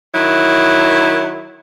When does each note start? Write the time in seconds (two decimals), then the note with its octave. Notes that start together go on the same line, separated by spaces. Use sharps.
0.15 D#3 F#3 E4